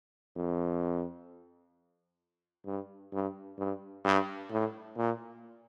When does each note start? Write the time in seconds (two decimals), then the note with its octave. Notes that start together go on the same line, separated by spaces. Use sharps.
0.36 F2
2.66 G2
3.13 G2
3.58 G2
4.04 G2
4.51 A2
4.97 A#2